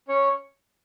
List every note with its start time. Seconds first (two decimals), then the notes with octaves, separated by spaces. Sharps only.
0.08 C#4 C#5